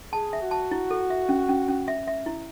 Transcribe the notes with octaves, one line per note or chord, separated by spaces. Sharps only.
G#4 A5
E5
F#4
A5
E4
A4
E5
C#4
C#4
C#4
E5
E5
E4